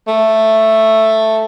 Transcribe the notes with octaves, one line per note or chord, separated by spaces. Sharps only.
A3